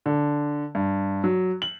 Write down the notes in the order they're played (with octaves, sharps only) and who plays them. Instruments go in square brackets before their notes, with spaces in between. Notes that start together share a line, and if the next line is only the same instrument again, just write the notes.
[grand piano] D3
G2
F#3
F#7